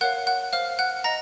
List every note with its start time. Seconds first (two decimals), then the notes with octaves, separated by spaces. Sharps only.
0.01 A#4 C#5 F5 F#5 F#6
0.27 F#5 F#6
0.53 C5 F5 F6
0.79 F#5 F#6
1.04 D#5 F#5 A#5 A#6